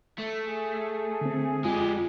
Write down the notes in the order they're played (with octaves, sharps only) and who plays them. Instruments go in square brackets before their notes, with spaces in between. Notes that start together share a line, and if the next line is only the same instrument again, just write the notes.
[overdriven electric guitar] A3
[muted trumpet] G#4
[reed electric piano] D3 C4
[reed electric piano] F2 F4 [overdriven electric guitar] G#3 G4